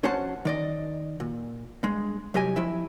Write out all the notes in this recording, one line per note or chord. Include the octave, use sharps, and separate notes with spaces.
F2 C#4 F#4 C5 F#5 A5
D#3 D5 D#5
A#2
G2 G#3
C2 F#3 G4 D#5 G#5
F2 F3 E4 E5